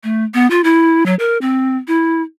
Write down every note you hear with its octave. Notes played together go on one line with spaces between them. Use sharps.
A3
B3
F4
E4
F#3
A#4
C4
E4